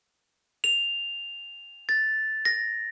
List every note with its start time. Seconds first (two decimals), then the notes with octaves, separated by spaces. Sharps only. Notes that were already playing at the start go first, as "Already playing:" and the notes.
0.64 F7
1.89 A6
2.45 A#6